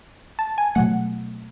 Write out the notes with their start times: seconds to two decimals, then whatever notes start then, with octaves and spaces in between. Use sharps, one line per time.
0.39 A5
0.58 G#5
0.75 B2 F#3 A3 F#5